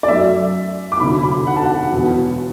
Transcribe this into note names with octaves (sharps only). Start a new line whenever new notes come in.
D5
F#2 F#3 A3 E5
D6
E1 D2 D3 B5
B5
F#5
A5
F#5
E1 E2 B2 B3